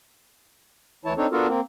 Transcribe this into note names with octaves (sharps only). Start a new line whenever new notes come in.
D2 E3 E4 C#5 A5
C4 D4 D#4 A4 C#5
B3 D4 F4 F#4 A4 A#4
A#3 C4